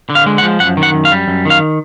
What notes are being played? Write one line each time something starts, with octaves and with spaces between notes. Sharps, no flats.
D3
F5
G#3
F#5
F3
F#2 F#5
D#3
F#5
F#2
F5
G3
F#2
D#3 F5